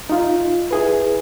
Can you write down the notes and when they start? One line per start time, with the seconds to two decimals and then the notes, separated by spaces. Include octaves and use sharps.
0.10 D#4 F4
0.71 E4 G#4 B4